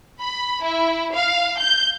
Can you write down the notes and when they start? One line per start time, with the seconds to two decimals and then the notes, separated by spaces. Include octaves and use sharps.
0.21 B5
0.62 E4
1.13 F5
1.59 G6